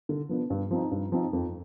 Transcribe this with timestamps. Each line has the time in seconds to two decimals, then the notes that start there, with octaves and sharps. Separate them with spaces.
0.09 D3
0.29 F3 B3 D4
0.50 G2
0.71 F3 C4 D#4
0.91 G2
1.12 F3 C4 D#4
1.33 F2